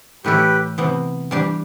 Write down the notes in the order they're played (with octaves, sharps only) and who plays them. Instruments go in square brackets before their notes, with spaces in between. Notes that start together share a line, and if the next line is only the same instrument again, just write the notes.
[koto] A2 E3 A3 E4 A4 [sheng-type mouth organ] G4 B4
[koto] C3 E3 B3
E3 G3 D4 G4